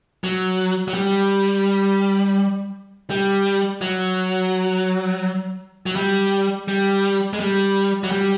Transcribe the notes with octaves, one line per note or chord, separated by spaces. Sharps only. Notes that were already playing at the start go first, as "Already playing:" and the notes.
F#3
F#3
G3
G3
F#3
F#3
G3
G3
G#3
G3
F#3
G3